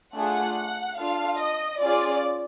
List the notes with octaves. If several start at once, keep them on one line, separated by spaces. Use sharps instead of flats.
A3 D4 F4 G#4 F#5
D4 F4 A4 F5
D#5
C#4 F4 G#4 D5